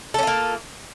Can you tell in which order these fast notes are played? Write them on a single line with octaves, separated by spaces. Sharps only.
A4 C#4 F4 A#3